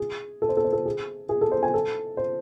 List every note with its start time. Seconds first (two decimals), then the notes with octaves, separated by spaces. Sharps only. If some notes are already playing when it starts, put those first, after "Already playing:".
Already playing: G#4
0.42 A4
0.49 C5
0.57 A4
0.64 C5
0.73 A4
0.86 G#4
1.29 G#4
1.41 A4
1.52 C5
1.63 G#5
1.74 A4
2.17 C5